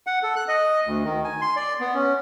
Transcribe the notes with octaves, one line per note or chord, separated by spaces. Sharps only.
F#5
A4
F#6
D#5
D2
D#3
G#5
C6
D5
B3
C#4